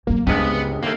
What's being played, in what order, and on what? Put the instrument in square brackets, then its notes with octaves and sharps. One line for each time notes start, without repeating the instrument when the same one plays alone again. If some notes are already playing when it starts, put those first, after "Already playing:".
[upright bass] E2 F#3 [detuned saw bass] A#3
[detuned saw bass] C#2 [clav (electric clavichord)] G2 C3 G#3 [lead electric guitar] B3 [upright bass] D4
[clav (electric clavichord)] D#2 A3 [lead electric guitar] A#3